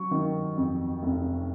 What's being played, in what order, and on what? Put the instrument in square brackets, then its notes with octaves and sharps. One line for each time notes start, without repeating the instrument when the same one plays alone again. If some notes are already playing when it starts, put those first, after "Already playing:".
Already playing: [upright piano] F#3 C#6
D#3
F2
F1